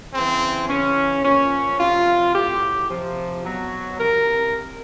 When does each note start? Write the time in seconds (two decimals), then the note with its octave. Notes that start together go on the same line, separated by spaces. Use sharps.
0.13 C#3 E3 C4
0.68 C#3 E3 C#4
1.24 A#2 F3 C#4
1.79 C3 F3 F4
2.34 A2 F#3 G4
2.89 C3 F3
3.44 B2 F#3
3.99 C3 E3 A#4